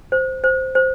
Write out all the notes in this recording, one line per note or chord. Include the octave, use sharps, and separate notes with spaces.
C5
C5
C5